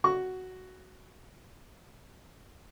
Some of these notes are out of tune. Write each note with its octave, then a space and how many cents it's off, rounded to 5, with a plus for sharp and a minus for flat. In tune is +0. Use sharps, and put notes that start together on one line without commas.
F#4 +5 C#6 +10